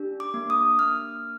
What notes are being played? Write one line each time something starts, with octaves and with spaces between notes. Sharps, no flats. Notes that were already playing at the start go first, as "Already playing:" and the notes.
Already playing: D4 G4
D6
A#3
D#6
A#3 F6